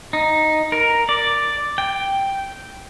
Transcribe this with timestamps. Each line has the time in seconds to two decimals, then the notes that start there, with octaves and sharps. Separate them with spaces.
0.13 D#4
0.72 A#4
1.09 D5
1.78 G5